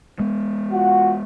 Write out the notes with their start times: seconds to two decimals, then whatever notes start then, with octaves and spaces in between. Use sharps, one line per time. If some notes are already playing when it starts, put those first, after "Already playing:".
0.20 G#3 B3
0.72 F4 F#4 F#5